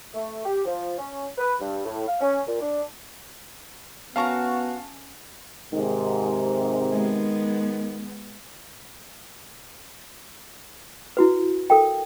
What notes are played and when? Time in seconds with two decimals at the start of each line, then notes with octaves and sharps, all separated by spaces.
0.14 A3
0.44 G4
0.65 F3
0.98 C#4
1.38 B4
1.60 G2
1.86 A2
2.08 F5
2.21 C#4
2.47 A#2
2.61 D4
4.16 B3 C#4 F#4 A#4 F5 A5 A#5 C#6
5.73 G#2 C3 D#3
6.92 G#3 B3
11.17 E4 F#4 B4
11.70 A4 A#4 F5 G5